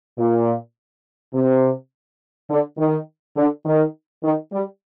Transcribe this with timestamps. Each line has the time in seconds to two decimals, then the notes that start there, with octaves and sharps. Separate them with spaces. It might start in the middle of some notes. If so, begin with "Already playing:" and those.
0.19 A#2
1.34 C3
2.50 D3
2.79 D#3
3.37 D3
3.66 D#3
4.24 D#3
4.52 G3